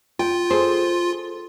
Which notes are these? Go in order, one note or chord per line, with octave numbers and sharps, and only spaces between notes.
F4 G5
G#4 A4 C5